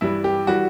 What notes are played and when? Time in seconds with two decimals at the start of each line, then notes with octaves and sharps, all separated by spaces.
0.01 G2 E3 G3 E4
0.24 G4
0.47 E3 G3 F#4